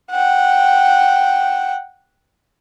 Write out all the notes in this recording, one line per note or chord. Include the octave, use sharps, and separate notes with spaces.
F#5 G5